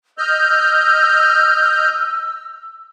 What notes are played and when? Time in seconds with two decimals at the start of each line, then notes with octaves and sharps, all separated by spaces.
0.18 D#5 E6 F6 G6